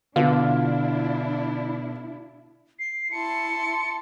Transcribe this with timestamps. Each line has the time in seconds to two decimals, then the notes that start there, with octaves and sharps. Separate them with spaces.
0.16 B2 D3 D4 E4 F4
2.79 C7
3.12 E4 A5 C6 C#7